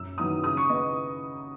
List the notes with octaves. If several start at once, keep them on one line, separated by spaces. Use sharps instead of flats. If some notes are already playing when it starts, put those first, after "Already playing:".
Already playing: F#2 E6
D#3 F#3 B3 E4 D#6
C#3 D#6
C#6
B3 D#5